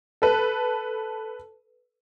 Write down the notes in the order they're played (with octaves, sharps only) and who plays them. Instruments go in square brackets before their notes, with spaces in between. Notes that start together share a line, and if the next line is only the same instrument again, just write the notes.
[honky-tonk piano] A4 B4